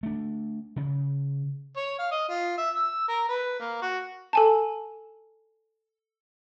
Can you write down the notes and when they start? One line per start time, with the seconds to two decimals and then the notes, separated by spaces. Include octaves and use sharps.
0.03 A3 D4
0.76 C#3
1.76 C#5
1.98 F5
2.11 D#5
2.28 F4
2.58 E5
2.75 E6
3.08 A#4
3.29 B4
3.60 A#3
3.82 F#4
4.33 A4 G#5 A5